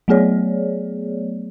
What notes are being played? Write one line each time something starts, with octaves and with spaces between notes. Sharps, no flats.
F#3 A3 B3 G#4 C#5 D5